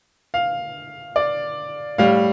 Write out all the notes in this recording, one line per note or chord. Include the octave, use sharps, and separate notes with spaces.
F5
D5
A2 G3 F5